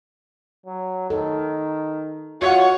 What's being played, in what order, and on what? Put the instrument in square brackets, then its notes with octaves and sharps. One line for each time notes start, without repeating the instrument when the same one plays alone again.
[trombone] F#3
[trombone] D#3 [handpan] A4
[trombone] F4 [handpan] F#4 [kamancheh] C#5 [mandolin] D#5 E5 F#5